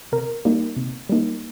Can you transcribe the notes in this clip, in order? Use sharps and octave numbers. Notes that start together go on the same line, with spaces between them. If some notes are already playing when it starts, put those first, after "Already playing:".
C3 A#4
G3 A#3 D#4
C3
G3 A#3 D#4